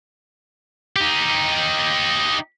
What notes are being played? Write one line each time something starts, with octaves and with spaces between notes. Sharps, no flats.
D#4 G4